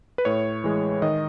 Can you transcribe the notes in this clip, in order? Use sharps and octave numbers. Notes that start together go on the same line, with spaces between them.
B4
A2 C#5
E3 G#3
D#3 D#5